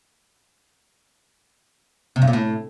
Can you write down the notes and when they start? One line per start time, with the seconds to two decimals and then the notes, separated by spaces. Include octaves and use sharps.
2.16 C3
2.22 G2
2.27 A#2
2.33 A2